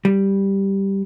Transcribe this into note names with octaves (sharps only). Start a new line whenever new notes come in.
G3